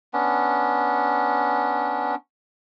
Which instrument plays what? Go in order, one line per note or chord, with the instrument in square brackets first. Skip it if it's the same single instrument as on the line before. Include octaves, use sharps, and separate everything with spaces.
[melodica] B3 C#4 D4